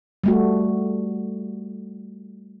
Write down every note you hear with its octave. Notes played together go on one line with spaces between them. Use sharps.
G3 A3 F#4